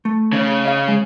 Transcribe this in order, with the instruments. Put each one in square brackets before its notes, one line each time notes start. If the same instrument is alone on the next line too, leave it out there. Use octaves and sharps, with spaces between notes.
[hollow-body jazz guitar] A3
[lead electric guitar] C#3 C#4
[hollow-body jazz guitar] D#5 F5
G#3